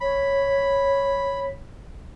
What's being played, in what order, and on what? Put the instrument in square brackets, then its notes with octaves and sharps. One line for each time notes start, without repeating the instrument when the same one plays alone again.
[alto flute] C#5 [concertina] B5